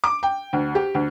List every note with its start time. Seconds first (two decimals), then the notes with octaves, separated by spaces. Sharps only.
0.04 D6
0.23 G5
0.53 D2
0.75 G4
0.95 D2